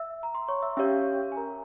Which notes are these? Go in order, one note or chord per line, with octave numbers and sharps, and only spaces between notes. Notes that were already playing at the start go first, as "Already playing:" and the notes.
Already playing: E5 E6
A#5
C6
C#5 C#6
E5 E6
C#4 G4 C#5 E5 F5 E6
G#5
A#4 A#5